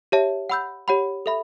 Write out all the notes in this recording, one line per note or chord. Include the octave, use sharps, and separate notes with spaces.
G4 C#5 E5 A5
F#5 B5 E6 G6
G4 C#5 F#5 B5
A4 E5 B5